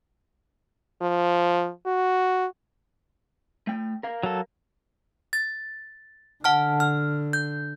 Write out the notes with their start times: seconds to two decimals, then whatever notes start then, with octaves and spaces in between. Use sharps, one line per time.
1.01 F3
1.86 F#4
3.67 A3 G5
4.03 A#4 F5
4.23 F#3 A4
5.33 A6
6.44 D3 F#5 A5 F6
6.80 F6
7.33 G6